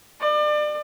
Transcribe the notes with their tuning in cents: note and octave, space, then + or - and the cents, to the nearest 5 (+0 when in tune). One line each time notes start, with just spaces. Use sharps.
D5 +35